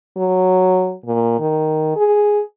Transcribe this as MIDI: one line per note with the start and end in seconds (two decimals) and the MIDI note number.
0.17 0.94 54
1.06 1.38 46
1.39 1.95 51
1.96 2.41 68